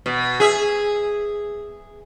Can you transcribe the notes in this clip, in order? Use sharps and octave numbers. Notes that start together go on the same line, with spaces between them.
B2
G#4 E5